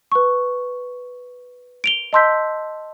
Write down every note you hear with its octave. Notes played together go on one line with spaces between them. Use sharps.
B4 C#6
D7 F7 G7
D#5 A5 C6 E6 G6 B6